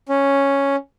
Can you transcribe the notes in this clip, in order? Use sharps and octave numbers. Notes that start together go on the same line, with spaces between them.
C#4